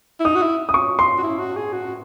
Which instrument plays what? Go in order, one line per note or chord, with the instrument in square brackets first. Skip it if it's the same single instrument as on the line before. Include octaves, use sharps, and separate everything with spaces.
[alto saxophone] E4
[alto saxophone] D#4 [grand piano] D#6
[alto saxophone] F#4
E4
[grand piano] D#6
C#6
C6
[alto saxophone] F#4
E4
F#4
G#4
F#4